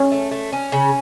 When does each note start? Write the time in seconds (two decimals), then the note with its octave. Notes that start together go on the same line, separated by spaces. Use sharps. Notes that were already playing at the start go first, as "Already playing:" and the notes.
Already playing: C#4
0.12 A3
0.31 A3
0.53 C#4
0.72 C#3